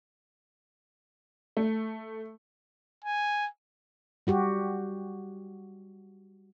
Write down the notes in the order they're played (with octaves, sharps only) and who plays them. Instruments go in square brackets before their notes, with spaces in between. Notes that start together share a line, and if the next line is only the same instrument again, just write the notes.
[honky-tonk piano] A3
[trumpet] G#5
[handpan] G3 F#4 G4